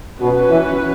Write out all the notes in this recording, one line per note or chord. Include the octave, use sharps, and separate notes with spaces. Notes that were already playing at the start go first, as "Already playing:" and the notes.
B2 F#3 C#4 F#4 B4
E3